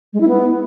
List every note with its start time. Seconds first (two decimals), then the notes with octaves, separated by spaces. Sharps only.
0.13 G#3
0.21 E4
0.28 B3